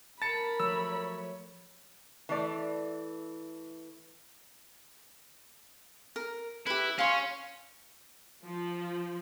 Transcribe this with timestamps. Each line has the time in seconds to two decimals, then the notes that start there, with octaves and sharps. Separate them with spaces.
0.22 A#4 A5 B5 A6 C#7
0.60 F3 F#3 A3 C#5 E6
0.97 C#5
2.29 E3 A3 D5
6.16 A#4
6.67 E4 G4 B4
6.99 C#4 F5 C6
8.46 F3